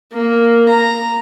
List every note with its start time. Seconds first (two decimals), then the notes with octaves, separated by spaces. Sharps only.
0.12 A#3
0.69 A#5